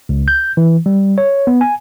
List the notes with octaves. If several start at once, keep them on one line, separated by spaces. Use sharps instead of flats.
C#2
G6
E3
G3
C#5
B3
G#5